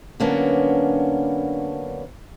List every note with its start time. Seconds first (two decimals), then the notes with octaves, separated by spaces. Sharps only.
0.20 D3 F#3 A#3 B3 C#4 D4